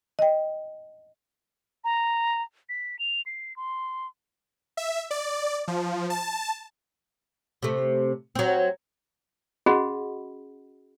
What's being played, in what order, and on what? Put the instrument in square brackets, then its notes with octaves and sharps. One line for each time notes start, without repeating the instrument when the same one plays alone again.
[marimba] D#5 G5
[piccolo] A#5
B6
F7
C7
C6
[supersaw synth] E5
D5
F3
A5
[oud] C3 A3
F#3 C4
[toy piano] C#4 F#4 G#4 D#5 F#5 B5